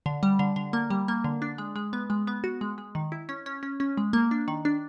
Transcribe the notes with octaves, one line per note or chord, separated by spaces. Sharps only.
D3
G3
D3
D3
A#3
G3
A#3
D3
D4
G#3
G#3
B3
G#3
B3
F#4
G#3
G#3
D#3
E4
C#4
C#4
C#4
C#4
G#3
A#3
D4
D#3
D4